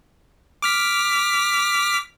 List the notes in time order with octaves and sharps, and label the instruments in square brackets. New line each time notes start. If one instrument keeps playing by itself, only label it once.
[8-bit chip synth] D6 F6 B6